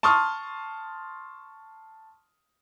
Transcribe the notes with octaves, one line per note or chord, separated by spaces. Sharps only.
A5 C6 C#6 D#6 F6